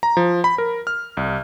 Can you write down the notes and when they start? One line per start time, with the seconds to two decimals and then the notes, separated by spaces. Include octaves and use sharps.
0.03 A#5
0.17 F3
0.44 B5
0.58 A#4
0.87 F6
1.17 C2